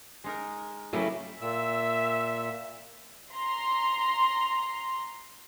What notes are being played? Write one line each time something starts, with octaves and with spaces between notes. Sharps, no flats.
G#3 D#4 A#4
C#3 F#3 G3 A3 E4
A#2 E5 E6
A#5 C6